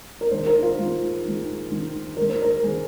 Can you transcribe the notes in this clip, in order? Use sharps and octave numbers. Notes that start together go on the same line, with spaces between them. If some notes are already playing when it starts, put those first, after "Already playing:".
A#4
D#3 G#3 C5
A#4
F4
D#3 G#3
D#3 G#3
D#3 G#3
D#3 G#3 A#4
C5
A#4
D#3 G#3 G#4